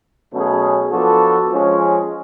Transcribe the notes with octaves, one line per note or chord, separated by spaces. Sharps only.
B2 F#3 A3 C#4 G#4
F3 B3 D4 F#4 A4
F3 G#3 C#4